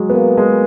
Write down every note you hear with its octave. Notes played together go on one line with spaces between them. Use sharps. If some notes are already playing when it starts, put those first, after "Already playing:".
Already playing: F#3 G#3
B3
A#3
G#3